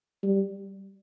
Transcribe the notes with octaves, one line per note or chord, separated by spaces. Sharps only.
G3